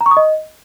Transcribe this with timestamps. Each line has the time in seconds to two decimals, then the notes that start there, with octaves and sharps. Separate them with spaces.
0.01 A#5
0.06 C#6
0.11 D#6
0.17 D#5